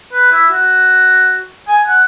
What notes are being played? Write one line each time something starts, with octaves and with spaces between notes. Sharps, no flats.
B4
E4
F#4
G#5
F#5